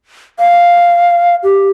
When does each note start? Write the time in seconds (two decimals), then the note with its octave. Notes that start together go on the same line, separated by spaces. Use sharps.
0.39 F5
1.43 G4